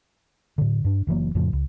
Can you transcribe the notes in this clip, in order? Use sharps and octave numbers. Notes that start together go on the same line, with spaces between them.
A2 D3
G2 D4
F#1 E3 F#3 A#3
F2 A2 C#3 F3
C#2